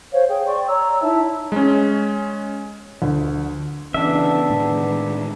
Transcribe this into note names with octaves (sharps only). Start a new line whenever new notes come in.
C5 C#5 F5
G#4 G5
D5 G5 C6 C#6
C#5 A#5 E6
D#4 E4 E5 A5
G#3 C#4
D2
C#3 E3 B3 D4 E5
A2 D#3 G#3